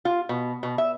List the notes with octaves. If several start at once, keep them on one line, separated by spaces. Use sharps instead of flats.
F4
B2
B2
E5